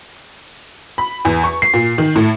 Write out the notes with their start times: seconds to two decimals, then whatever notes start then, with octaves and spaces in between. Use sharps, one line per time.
0.98 B5
1.25 E2
1.44 C#6
1.62 C7
1.74 A#2
1.98 D#3
2.16 A2